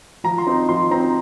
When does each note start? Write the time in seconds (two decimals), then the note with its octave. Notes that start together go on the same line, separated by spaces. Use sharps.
0.24 F3 A#5
0.38 C6
0.47 C4 D#4
0.69 F3 C6
0.91 C4 D#4 A#5